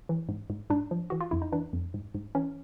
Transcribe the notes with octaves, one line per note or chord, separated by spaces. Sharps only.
E3
G#2
G#2
G#2 D4
F3
E3 F#4
F4
F2 E4
D#4
E3 D4
F2
G#2
G#2
E3 C#4